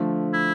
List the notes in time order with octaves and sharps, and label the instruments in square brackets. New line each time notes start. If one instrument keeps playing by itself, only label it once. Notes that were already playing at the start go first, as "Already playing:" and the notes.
Already playing: [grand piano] D3 F3 A3
[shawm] E4